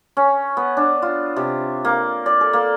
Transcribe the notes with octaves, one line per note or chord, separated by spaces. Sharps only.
C#4
B3
D4
F4
C3
A#3
D5
A4
A#3